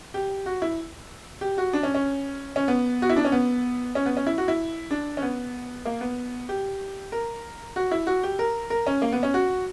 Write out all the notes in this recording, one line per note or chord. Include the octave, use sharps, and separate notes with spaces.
G4
F#4
E4
G4
F#4
D4
C#4
C#4
C#4
B3
F#4
E4
D4
C#4
B3
C#4
B3
C#4
E4
F#4
E4
D4
C#4
B3
A#3
B3
G4
A#4
F#4
E4
F#4
G4
A#4
A#4
C#4
A#3
B3
C#4
F#4